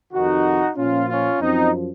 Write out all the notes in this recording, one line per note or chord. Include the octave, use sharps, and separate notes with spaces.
F2 C3 D#3 D#4 F#4
A#2 F3 C#4 F4
C#4 F4
F#2 F3 C4 D#4